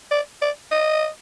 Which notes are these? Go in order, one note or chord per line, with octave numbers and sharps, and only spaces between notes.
D5
D5
D#5